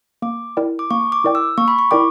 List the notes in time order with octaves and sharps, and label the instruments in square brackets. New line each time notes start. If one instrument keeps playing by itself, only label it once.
[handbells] A#3 [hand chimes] D6
[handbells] E4 A#4 D5 G5
[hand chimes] D6
[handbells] A#3 [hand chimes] C#6
[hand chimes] D6
[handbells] E4 A#4 D5 G5
[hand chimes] E6
[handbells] A#3 [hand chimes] C#6
[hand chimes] B5
C#6
[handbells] E4 A#4 D5 G5 [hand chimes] D6